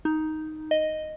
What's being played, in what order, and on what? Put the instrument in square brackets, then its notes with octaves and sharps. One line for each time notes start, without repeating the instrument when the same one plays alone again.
[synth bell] D#4
D#5